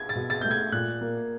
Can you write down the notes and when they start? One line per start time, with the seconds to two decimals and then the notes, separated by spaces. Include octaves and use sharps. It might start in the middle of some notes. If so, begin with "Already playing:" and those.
Already playing: G#6
0.09 A6
0.15 B2
0.30 A6
0.41 A3 G6
0.51 G#6
0.72 A#2 F#6
1.01 A#3